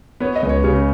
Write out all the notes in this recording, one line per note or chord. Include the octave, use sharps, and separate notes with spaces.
B3 C#5
D#5
C#2
C#5
C#3 C#5